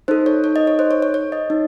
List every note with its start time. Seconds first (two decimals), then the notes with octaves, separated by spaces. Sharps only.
0.08 D#4 A4 C5
0.26 C#5
0.44 C#5
0.56 D#5
0.67 C#5
0.79 C5
0.91 C#5
1.02 C#5
1.14 C#5
1.32 D#5
1.50 D#4